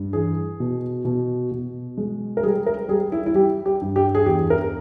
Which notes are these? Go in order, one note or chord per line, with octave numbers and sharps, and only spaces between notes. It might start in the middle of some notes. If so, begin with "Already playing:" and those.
Already playing: G2
E3 G#4
B2
B2
B2
G#3
A#4
G3 G#4
A#4
G3 G#4
E4
E4
G3 G4
G4
G2
G4
G#4
E2 G4
A#4